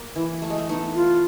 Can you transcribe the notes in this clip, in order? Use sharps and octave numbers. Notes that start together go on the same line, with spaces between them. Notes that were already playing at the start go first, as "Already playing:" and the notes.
Already playing: A#3
E3 E4
A3
G#3
A3
A3 B3 D#4
F4